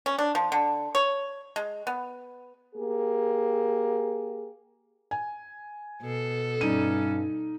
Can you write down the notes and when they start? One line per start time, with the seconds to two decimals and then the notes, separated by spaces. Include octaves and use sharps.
0.06 C#4
0.19 D4
0.35 F3
0.52 D3
0.95 C#5
1.56 G#3
1.87 B3
2.75 A#3 G4 G#4
5.11 G#5
6.02 B2 A4
6.61 G2 G3 C#4 D#4 D#7